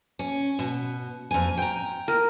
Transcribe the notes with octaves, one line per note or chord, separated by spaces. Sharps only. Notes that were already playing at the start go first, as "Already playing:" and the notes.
C#4
B2
F2 G#5
G5 A#5
A#4